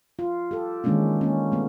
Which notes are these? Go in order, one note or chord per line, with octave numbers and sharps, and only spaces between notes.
F4
G4 A4
D#3 E3 G#3 A#3 C#4 D4
A#3 C#4
A3 B3